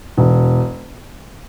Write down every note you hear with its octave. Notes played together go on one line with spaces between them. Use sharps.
E1